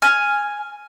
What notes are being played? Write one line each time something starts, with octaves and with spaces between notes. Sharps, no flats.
G#5 F6